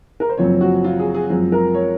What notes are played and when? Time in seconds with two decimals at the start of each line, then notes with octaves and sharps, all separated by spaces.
0.20 A#4
0.29 C5
0.38 F#1 F#2 F3 C4 C#5
0.61 F#4
0.84 F4
0.99 G#4
1.14 G#4
1.29 F#2 F3 G#3 C4
1.52 A#4
1.75 C#5